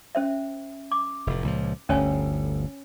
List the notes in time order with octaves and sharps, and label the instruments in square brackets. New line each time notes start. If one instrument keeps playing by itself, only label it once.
[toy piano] C#4 C5 E5
D6
[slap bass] F1 A2
C#2 A#2 F3
[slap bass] G1 D2 [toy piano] C#4 C#5 G#5